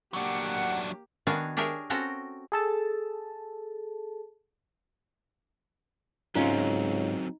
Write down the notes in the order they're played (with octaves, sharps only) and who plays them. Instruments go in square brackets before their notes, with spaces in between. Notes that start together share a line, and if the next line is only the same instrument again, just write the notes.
[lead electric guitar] F#3 D4 [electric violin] A#3 G4 [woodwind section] F#5
[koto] D#3 B3 D4 F#4 F5 G#5
D4 G4 G#4 A#4 C#5 E5
C4 C#4 F#4 A4 G5 A#5
[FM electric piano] G#4 A4 A5
[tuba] C#2 [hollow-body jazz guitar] G#2 C#4 F4 [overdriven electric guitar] F#3 C4 [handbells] D#4